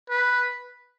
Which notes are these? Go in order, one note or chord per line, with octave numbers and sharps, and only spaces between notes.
B4